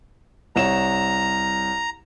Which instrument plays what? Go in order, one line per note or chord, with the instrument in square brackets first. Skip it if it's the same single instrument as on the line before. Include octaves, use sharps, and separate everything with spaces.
[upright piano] C2 C#5 E7 [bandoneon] A#5